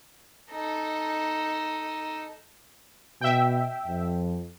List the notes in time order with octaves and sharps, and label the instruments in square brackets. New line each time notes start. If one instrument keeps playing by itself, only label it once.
[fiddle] D#4 A4
[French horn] B2 [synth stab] E5 G5
[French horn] F2